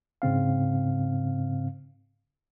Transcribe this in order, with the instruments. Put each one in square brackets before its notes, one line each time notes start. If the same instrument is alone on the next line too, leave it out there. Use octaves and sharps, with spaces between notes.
[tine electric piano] G#2 C#3 C4 F5